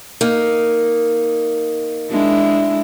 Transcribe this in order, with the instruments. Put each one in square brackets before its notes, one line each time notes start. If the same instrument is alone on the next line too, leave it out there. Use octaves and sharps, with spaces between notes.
[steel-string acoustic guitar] A#3 D#4
[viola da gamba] G#3 D4 E4